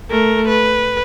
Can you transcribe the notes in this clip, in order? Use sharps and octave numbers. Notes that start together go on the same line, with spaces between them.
A3 A#4
B4